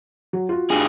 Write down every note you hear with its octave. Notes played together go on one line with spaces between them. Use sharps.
F#3
F4 F#4
G2 G#4